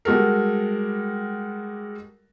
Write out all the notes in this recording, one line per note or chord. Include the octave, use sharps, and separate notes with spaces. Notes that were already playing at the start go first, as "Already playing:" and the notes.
G3 G#3 F#4 A4 A#4